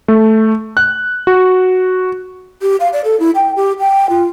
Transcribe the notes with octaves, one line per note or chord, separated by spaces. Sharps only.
A3
F#6
F#4
G4
F5
D5
A4
E4
G5
G4
G5
F4